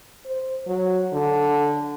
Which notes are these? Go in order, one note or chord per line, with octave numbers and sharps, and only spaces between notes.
C5
F#3
D3